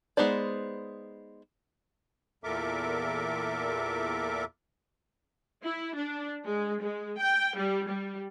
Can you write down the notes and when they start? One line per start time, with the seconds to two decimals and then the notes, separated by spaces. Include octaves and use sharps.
0.17 G#3 B3 D#4 C5 D5
2.44 E2 A#2 A4 A#4 E5 D6
5.63 E4
5.95 D4
6.45 G#3
6.81 G#3
7.19 G5
7.57 G3
7.87 G3